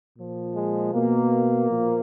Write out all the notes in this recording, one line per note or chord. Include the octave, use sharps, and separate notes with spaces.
A#2 F3
G#3
B2 A#3
A#2 F3